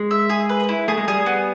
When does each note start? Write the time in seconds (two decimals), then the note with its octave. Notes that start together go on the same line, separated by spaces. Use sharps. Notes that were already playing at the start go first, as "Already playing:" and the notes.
Already playing: G#3
0.11 E5
0.30 G#4
0.49 B4
0.69 E4
0.88 A3 G#4
0.97 G#3
1.08 G3 G#4
1.26 B3